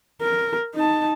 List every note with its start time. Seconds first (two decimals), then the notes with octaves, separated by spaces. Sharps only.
0.21 A#4
0.75 D#4 A5